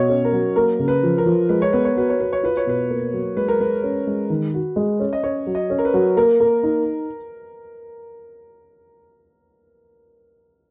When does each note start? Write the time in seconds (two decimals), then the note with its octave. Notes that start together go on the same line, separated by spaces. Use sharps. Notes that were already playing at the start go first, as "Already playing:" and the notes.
Already playing: B2 C#5 D#5
0.09 C#4
0.25 A#4
0.32 F#3
0.56 A#3 A#4
0.79 C#3
0.88 B4
1.03 F3
1.18 A#4
1.26 F3
1.49 G#3 B4
1.62 C#5
1.73 B3 B4
1.85 C#5
1.96 F#4 B4
2.10 C#5
2.20 F#4 B4
2.33 C#5
2.43 F4 B4
2.57 C#5
2.66 B2 B4
2.90 A#3
3.13 F#3
3.36 G#3 B4
3.48 A#4
3.60 G#3 B4
3.83 C#4
4.07 G#3
4.30 D#3
4.54 F#4
4.76 G#3
5.00 C#4
5.13 D#5
5.23 C#4 C#5
5.47 F#3
5.55 D#5
5.70 C#4
5.78 A#4
5.85 B4
5.94 F#3
6.17 A#3 A#4
6.40 A#3
6.63 D#4